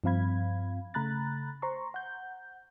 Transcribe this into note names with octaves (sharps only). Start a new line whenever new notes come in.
G2 F3 C4 F5 B5 G#6
C#3 A3 A#5 B5 F#6 A6
C5 A#5 C6 C#6
F#5 G6